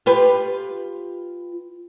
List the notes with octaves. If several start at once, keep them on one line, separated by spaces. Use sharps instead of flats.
F4 G4 B4